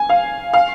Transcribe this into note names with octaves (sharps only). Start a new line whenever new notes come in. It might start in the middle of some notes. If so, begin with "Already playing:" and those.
Already playing: G#5
F5
F5